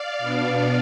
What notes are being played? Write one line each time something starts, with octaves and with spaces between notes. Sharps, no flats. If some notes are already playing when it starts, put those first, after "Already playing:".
Already playing: D5 F5
B2 B3 D4